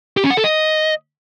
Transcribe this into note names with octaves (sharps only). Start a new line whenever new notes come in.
G4
C#4
F#5
A4
D#5